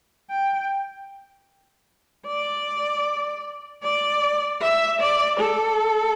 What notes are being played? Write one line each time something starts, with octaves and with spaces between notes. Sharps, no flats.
G5
D5
D5
E5
D5
A4